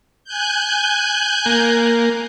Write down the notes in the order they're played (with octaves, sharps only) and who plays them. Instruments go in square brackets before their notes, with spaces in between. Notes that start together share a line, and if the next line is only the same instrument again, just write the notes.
[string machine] G#5 F#6 G6
[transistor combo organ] A#3